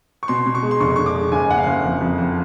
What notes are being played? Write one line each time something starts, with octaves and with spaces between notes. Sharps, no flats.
C#6
B2 C6
B2
C#6
G#3
C6
F1 C#6
F1 C#6
D6
G#3
F#1 G#5
F#1 F#5
F5
F#1
F2
F2
F2